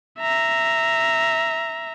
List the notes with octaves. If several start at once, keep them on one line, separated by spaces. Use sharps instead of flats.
E5 A#5